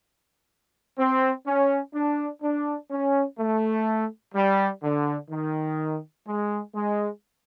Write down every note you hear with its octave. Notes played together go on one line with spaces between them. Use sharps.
C4
C#4
D4
D4
C#4
A3
G3
D3
D#3
G#3
G#3